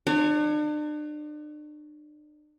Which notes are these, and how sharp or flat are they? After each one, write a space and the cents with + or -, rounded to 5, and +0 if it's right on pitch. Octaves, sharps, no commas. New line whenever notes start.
D4 +40 C#5 +0